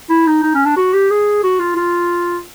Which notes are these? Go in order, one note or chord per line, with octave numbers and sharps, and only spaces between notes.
E4
D#4
D#4
C#4
D4
F#4
G4
G#4
F#4
F4
F4